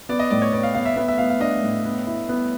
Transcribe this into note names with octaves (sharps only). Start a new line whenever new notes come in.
B3 D5
D#5
A2 D5
C#5
B3 D5
F5
B3 F5
E5
B3 E5
E5
B3 F5
F5
D4 D#5
A2
B3
E4
B3